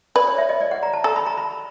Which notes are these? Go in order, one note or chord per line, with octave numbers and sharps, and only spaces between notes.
B4 D5
C#5
E5
D#5
D5
F#5
A#5
A5
A4 A#5
B5
A#5
B5